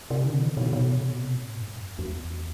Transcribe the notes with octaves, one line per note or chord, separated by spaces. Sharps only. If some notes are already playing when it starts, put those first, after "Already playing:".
C3
D3
E3
B2
B2
C3
B2
A2
G2
F2
E2